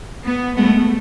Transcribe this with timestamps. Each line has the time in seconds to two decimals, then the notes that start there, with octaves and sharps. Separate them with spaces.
0.25 B3
0.57 G#3 A3 B3